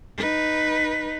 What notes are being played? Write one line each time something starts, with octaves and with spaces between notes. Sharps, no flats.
D#4 B4